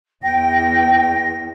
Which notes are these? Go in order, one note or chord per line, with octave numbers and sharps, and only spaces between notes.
E2 G5 A#6